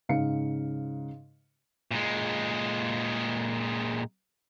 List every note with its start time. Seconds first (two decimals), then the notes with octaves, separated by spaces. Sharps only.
0.09 G#2 C#3 F5 C#7
1.91 A#2 G#3